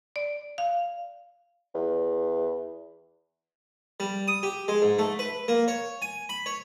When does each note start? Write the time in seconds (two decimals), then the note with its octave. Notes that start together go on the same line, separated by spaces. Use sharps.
0.16 D5
0.58 F5
1.75 E2
4.00 G3
4.28 D#6
4.43 G4
4.68 G#3
4.82 G#2
4.99 A3
5.19 B4
5.48 A#3
5.68 C#5
6.02 G#5
6.29 B5
6.46 C#5